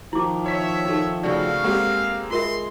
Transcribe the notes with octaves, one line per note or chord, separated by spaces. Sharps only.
D#3 F3 E4 D6
C#5 E5 B6
D#4 A4
C#3 A3 F#4 D5 F5
G#3 A#3 C4 G4 A4 F#5
G#3 F4 A#4 E5 C6